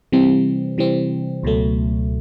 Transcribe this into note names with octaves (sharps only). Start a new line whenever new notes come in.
C3 E3 G3 C4
C3 E3 G3 C4
C#2 B2 F#3 A3